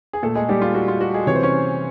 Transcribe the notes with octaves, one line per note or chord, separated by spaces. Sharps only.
G#4
A#2 A3 A4
G#3 G#4
G3 G4
F4
F#4
F4
F#4
G#3 G#4
C3 E3 C#5
C5
C#4 C#5